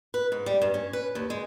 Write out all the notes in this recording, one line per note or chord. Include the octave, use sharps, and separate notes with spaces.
B4
G#2
G3
G2
C#4
B4
D#2
G#3